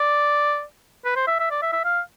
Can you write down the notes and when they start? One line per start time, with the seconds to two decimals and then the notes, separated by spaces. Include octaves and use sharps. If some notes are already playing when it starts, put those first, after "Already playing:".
Already playing: D5
1.05 B4
1.16 C5
1.28 E5
1.40 E5
1.51 D5
1.62 E5
1.73 E5
1.85 F5